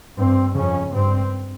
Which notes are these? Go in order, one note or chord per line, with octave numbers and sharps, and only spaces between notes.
G2 C4
F2 C#3 C#4
G2 C4